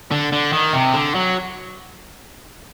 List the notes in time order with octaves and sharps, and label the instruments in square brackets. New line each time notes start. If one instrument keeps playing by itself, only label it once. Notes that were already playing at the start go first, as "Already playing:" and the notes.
[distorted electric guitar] D3
D3
D#3
C3
D3
F#3